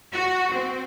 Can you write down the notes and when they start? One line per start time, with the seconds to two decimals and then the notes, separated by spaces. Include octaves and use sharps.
0.13 F#4
0.53 C4